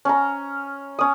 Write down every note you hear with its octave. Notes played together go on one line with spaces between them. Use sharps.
C#4 A#5
C#4 D#6